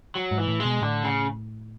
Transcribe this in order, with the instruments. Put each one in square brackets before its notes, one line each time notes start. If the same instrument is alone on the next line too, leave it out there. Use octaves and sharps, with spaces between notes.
[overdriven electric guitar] F#3
[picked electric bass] G#2
[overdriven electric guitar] E3
[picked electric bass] A2
[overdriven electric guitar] G#3
[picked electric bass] B2
[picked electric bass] A2 [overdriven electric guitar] D3
[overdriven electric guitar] C#3